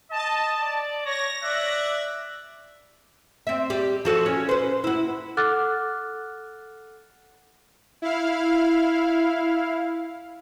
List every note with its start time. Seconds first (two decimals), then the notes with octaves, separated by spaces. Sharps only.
0.11 D#5 A5
0.61 D5
1.05 C#5 A#6
1.43 D5 E5 F#6
3.47 C4 E5
3.70 G3 G4
4.05 F3 F#4 A4
4.26 C#4
4.49 B4 C5
4.84 E4 F#4
5.37 A4 F#5 D6 F6 F#6 A6
8.02 E4 F5